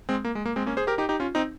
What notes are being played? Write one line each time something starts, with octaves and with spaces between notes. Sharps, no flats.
G#3 C4
A#3
G#3
A#3
G#3 C4
A#3 C#4
G#4 C5
G4 A#4
D#4 G4
D#4 G4
C#4 F4
C4 D#4